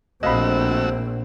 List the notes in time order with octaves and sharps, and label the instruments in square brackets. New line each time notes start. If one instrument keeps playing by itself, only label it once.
[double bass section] A#1 [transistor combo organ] A3 F#4 E6 [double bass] C4 [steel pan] D#5 F5 B5